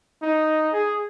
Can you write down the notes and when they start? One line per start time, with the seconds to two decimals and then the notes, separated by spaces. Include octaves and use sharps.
0.22 D#4
0.73 G#4